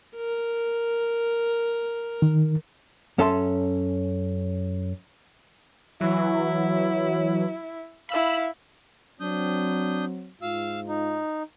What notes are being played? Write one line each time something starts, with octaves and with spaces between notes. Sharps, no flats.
A#4
D#3
F#2 C#4 A4 E5 A5 C6
E3 F#3 E4
E4 F5 B5 E6
F#3 C4 D4 D#6 G6
G#2 F4 F5 E6
D#4